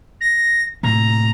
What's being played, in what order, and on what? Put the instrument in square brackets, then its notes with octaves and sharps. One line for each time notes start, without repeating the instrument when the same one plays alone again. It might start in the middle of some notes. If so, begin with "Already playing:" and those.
[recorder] A#6
[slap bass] A2 C3 A#3 [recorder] A#5